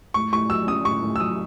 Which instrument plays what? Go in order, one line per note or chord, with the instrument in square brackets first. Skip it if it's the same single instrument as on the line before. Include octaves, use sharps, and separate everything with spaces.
[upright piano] A2 [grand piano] C#6
[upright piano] A2 [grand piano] C#6
[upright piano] F#3 [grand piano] E6
[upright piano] C#4 [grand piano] D#6
[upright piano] A2 [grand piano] C#6
[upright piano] A2
[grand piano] E6
[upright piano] F#3 [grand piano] D#6